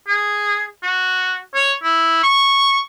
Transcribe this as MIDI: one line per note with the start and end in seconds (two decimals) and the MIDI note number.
0.07 0.64 68
0.84 1.37 66
1.54 1.73 73
1.83 2.22 64
2.23 2.79 85